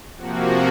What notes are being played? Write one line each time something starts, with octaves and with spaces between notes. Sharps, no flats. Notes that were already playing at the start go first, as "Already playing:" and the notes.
C3 F3 A#3 F#4